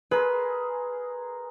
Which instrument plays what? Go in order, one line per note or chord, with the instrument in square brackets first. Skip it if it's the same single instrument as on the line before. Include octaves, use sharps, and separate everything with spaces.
[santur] G#4 A#4 C6 [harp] B4